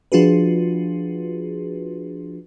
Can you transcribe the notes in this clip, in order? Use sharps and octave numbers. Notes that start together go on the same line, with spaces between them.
F3 D4 F4 F#4 G#4 B4